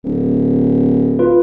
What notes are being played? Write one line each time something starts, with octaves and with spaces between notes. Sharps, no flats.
D1
F4 B4